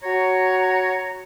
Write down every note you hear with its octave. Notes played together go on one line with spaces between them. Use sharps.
F#4 C#5 A#5